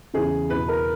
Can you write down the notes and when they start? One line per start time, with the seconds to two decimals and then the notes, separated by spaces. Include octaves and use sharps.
0.14 E2 C#3 E3 G#4
0.50 E2 B2 B4
0.68 A#4